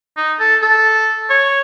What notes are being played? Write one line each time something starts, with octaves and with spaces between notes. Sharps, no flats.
D#4
A4
A4
C#5